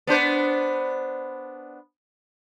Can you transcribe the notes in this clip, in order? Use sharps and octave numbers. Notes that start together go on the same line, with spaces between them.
B3 D4 C5